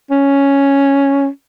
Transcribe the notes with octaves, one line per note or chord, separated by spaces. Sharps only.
C#4